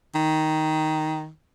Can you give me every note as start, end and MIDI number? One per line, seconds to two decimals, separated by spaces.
0.15 1.30 51